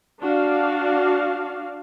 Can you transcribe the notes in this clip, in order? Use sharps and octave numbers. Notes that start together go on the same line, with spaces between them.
D4 F#4 D5 F5